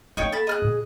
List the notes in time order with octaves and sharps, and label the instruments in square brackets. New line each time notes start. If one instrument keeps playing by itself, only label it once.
[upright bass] A#3 B3 [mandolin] D#4 C#5 G5
[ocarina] A4 [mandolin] A5 B5
[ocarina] G#4 [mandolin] D#5 F6 F#6
[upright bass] A#2